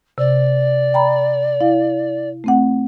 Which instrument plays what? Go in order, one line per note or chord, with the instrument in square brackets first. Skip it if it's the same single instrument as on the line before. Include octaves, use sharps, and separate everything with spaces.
[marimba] C3 [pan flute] D5
[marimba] G5 A#5 B5
E4 F5
A3 C4 F#5